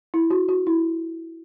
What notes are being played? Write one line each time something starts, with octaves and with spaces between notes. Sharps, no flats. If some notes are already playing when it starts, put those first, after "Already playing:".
E4
F#4
F#4
E4